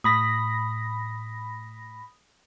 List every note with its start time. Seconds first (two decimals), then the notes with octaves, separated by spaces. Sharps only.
0.04 A2 B5 D#6 A#6